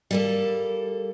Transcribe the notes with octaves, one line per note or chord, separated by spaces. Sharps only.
G3 A#3 A4